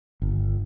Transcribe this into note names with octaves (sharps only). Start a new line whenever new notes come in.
G1